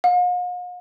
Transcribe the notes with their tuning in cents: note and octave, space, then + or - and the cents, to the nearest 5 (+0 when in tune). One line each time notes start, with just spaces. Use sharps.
F5 +45